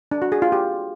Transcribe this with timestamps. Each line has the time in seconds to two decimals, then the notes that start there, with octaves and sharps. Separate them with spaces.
0.12 D4
0.22 F#4
0.32 G#4
0.42 F4
0.52 G4